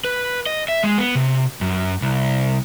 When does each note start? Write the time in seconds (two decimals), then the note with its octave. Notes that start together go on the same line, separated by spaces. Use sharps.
0.04 B4
0.46 D#5
0.68 E5
0.83 G#3
0.98 B3
1.15 C3
1.61 F#2
2.02 C2